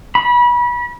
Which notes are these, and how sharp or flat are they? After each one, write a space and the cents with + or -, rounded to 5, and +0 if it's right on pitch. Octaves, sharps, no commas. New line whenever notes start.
B5 -30